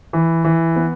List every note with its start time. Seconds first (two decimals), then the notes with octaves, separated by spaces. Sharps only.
0.13 E3
0.44 E3
0.76 B3